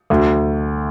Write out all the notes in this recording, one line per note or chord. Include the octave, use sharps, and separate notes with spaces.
D2